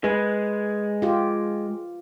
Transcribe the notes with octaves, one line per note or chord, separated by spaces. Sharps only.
G#3 B4
F4 G4